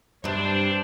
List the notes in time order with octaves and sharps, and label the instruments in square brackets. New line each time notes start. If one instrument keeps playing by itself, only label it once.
[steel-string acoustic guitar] G2 C3 [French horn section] D4 C5